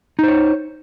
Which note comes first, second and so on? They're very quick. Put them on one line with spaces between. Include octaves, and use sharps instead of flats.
D#4 C5 C#5